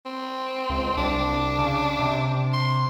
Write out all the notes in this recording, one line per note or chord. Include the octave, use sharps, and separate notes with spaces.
C4
C#2
C2 D4
C#3
C3
C6